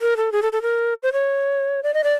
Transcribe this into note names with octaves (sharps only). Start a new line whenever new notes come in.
A#4
A4
G#4
A4
A4
A#4
C5
C#5
D5
D#5
D5